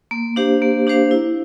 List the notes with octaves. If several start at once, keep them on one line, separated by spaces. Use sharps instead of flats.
A#3
D4 G4 C5 F5
A#3
D4 G4 C5 F5
E4